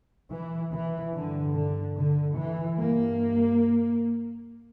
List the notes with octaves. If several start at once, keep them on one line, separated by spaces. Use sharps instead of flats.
E3
E3
G2 D3
D3
D3
E3
G2 A#3